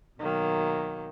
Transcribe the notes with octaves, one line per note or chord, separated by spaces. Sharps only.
B2 D#3 F#3 A#3